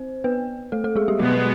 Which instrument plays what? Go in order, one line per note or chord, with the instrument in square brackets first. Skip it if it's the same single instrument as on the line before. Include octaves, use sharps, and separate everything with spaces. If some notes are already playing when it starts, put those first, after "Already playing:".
Already playing: [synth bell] C4 C5
B3 B4
A3 A4
A3 A4
G#3 G#4
G3 G4
[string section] B2 G#3 B3 [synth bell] F#3 F#4